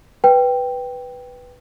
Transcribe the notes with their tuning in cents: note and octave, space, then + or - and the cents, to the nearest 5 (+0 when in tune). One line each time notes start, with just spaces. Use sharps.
B4 +0 G5 +0